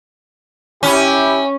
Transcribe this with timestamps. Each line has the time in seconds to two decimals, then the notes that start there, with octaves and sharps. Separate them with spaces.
0.83 C#4 E4 G4